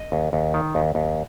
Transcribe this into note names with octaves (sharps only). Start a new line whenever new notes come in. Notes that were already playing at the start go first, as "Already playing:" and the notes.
Already playing: D#5
D#2
D#2
D#3
D#2
D#2